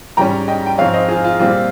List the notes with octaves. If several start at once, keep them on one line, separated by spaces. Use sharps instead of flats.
G#2 G3 C#4 G5 A#5
D#5 G5
G5
G#2 F3 C4 C#5 F5
C5 D#5
F4 G#4
F4
A#2 G3 C4 F4